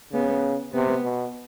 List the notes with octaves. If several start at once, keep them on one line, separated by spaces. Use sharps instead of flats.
C#3 B3
C3 B3
B2